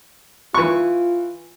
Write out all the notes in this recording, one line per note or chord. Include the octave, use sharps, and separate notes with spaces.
E3 F4 C#6